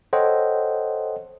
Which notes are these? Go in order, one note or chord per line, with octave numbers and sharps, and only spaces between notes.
A4 C5 C#5 D#5 F#5 G5